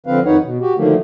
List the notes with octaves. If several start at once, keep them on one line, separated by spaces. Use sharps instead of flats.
D3 F3 C4 B4 F5
F2 D#3 D#4 B4 C#5 F#5
B2
F#4 G4
D3 D#3 F3 F#3 A3 A#3